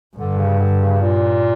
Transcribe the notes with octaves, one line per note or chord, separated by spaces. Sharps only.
G2 D3
C#3
D3
C#3
A#2